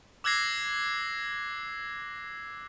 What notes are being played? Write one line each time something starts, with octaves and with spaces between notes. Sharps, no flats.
D6 E6 F#6 G#6 A#6 C7